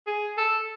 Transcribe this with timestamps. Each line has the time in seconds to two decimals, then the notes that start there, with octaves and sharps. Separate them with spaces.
0.07 G#4
0.37 A4